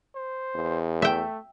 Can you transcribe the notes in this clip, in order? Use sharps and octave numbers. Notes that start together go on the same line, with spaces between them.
C5
E2
A3 E5 G5